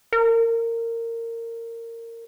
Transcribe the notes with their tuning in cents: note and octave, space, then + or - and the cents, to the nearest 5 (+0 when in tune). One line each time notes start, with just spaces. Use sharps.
A#4 -20